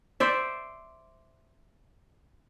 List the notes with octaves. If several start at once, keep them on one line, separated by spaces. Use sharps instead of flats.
C5 D5 E5